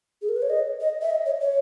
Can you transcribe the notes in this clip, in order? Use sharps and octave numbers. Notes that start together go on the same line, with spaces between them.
G#4
A#4
B4
C#5
D#5
D#5
E5
D#5
C#5
C#5